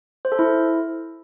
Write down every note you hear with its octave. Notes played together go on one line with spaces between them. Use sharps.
C5
A4
E4